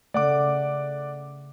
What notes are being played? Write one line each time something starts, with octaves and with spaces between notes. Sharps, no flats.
C#3 A3 D5 F#5 D6